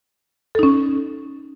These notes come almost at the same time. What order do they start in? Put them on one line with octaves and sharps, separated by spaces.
A4 D#4 C#4